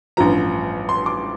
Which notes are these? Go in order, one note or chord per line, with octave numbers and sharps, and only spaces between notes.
A1 G2 F3 A#5
C6
D6